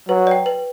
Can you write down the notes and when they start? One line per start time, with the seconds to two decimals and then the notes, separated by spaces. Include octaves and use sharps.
0.08 F#3 B4
0.27 D5 G5
0.46 B4